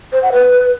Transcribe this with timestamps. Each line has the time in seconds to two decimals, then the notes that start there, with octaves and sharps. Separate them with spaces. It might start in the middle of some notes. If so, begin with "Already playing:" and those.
0.12 C5
0.22 F#5
0.32 B4